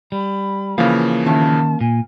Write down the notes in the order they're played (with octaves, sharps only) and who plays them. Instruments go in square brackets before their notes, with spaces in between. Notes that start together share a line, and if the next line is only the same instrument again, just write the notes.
[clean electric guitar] G3 [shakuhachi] B5
[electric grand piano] C#3 E3 F3 [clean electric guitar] A#3 [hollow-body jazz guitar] F5
[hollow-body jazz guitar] D#3 C#4 E5 [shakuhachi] A5
[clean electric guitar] A#2 [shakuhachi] G#5